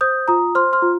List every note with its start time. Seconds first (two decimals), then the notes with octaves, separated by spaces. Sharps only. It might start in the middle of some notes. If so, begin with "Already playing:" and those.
0.01 C5 D#6 G6
0.28 F4 A#5 D#6
0.55 C5 C6 F6
0.73 C6 F6
0.82 F4